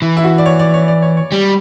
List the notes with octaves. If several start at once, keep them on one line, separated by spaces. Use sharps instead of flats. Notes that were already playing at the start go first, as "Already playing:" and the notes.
E3
E4
F#4
D5
C#5
D5
C#5
D5
C#5
C#5
G3